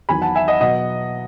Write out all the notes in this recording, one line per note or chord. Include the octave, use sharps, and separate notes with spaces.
E2 D#3 F#3 G#5 B5
F#5 A5
E5 G#5
D#5 F#5
B2 F#3 D#5 F#5